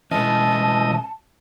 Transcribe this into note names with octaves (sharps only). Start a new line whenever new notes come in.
B2 E3 G#3 C#4 D#5 A5